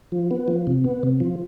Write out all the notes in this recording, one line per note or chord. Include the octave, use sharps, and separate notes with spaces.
F3
B3
F3
C3
B3
C3
F3